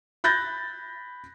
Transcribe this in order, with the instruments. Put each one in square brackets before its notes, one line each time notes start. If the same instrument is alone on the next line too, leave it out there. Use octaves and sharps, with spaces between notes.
[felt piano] B5 F#6 G6 A6 A#6